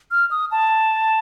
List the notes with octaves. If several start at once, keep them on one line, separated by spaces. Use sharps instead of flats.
F6
D#6
A5